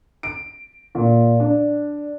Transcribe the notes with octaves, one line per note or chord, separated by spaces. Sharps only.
D7
A#2
D4